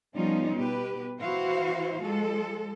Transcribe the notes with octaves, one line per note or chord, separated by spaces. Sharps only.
F3 G3 B3 C#4 D#4 F4
B2 G4 B4
E3 E4 F#4 C5 F5
F3 G#3 A4